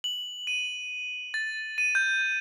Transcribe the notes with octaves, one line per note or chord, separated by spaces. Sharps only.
F#7
D#7
A6
D#7
G6